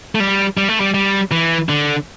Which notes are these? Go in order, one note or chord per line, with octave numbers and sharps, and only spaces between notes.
A3
G3
G3
A3
G3
G3
E3
D3